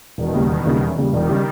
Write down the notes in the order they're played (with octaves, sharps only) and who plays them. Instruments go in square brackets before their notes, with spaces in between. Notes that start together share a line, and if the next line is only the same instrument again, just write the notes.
[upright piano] E1 [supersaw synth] B2 D#3
[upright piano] D#2 C#3 G3
E1
D#2 C#3 G3
[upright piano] E1 [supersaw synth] C#3 E3
[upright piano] D#2 C#3 G3
[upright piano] E1 [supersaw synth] D#3 G3
[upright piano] C#3 G3